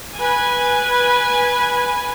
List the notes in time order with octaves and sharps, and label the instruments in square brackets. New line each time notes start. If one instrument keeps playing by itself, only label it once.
[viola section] B4 G#5